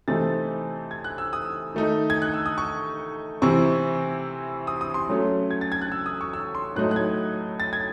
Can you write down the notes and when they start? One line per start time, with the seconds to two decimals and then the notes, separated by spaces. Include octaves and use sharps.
0.08 C3 E3 A3 C4 D#4 A6
0.91 G#6
1.04 F#6
1.18 E6
1.33 D#6
1.74 D#3 A3 D#4
2.10 G#6
2.22 F#6
2.34 E6
2.46 D#6
2.58 C#6
3.42 C3 E3 C4 E4 C#6
4.67 D#6
4.81 D#6
4.94 C6
5.09 F#3 A3 C#4
5.51 G#6
5.61 A6
5.72 G#6
5.82 F#6
5.92 E6
6.06 D#6
6.21 C#6
6.33 E6
6.55 C6
6.76 A2 F#3 A3 D#4 F#6
6.91 F#6
6.96 G#6
7.60 A6
7.73 G#6